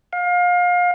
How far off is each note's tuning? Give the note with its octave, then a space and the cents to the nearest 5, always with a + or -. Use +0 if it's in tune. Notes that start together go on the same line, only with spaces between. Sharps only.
F5 +30